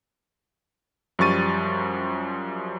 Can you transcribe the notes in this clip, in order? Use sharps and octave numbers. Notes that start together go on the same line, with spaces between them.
F#2 F3 G3 C#6 A6 D#7